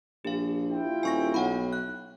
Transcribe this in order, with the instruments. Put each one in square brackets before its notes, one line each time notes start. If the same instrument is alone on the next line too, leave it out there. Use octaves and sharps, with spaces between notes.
[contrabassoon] A#1 [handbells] G4 F5
[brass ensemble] E4 F4 G5
[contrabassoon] D#1 [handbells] G#5 C#6 A#6
[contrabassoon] B1 [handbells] C#5 F#5 B5
[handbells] F#6